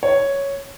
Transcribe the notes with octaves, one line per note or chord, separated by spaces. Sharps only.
C#5